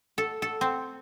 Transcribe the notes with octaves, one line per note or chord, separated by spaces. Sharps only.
A4
A4
C4